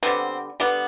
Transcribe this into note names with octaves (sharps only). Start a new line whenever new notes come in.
D3 G3 B3 C4
D3 G3 B3